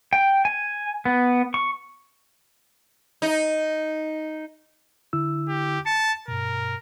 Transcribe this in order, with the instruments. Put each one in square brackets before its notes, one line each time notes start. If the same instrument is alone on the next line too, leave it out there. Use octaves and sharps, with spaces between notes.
[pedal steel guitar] G5
G#5
B3
C#6
[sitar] D#4
[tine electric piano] D3 E4 E6
[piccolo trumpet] G4
[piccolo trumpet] A5 [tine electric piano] C#7
[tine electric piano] G2 B2 [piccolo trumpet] A#4